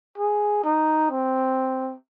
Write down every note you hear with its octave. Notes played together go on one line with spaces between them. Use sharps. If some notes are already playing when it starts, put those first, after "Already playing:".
G#4
D#4
C4